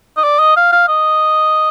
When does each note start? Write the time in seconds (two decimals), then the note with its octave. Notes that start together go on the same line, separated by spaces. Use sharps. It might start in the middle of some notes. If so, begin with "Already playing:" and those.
0.17 D#5
0.24 D5
0.39 D#5
0.56 F5
0.72 F5
0.88 D#5